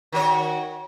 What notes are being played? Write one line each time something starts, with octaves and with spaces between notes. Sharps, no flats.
D#3 F#4 C#5